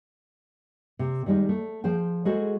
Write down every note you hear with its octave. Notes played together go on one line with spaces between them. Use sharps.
C3
D#3 G3 G#3 D#4
A3
F3 G#4 C5 G5
G#3 E4 F#4 G#4 A4 C5